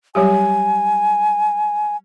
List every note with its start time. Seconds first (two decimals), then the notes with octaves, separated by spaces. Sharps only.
0.15 F#3 G3 G4 G#5